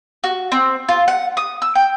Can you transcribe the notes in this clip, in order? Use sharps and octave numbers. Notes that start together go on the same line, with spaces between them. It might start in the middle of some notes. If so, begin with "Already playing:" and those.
F#4
C4
F4
F#5
D#6
E6
G5